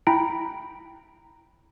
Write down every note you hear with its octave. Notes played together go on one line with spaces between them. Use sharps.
E4 G5 A#5 B5 D7